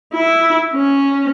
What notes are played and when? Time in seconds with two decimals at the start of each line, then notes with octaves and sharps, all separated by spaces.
0.13 E4
0.74 C#4